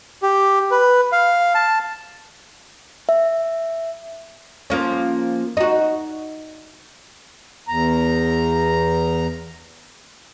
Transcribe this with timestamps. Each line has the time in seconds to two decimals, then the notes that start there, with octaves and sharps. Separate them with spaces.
0.23 G4
0.71 B4
1.12 F5
1.55 A5
3.09 E5
4.70 F3 A#3 C#4
5.57 D#4 F#4
7.68 E2 A#5